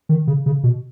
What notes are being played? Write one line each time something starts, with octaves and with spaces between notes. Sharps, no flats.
D#3
C#3
C#3
B2